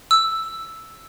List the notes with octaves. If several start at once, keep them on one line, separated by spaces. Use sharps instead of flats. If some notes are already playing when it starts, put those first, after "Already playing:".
E6